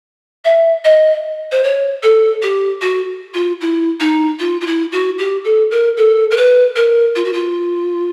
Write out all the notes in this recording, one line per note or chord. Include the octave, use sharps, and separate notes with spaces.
E5
D#5
C5
C#5
A4
G4
F#4
F4
E4
D#4
F4
F4
E4
F#4
G4
A4
A#4
A4
A#4
B4
A#4
F4
F#4
F4